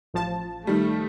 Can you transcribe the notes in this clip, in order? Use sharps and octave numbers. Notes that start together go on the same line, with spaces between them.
A1 F3 A5
D#3 G3 A3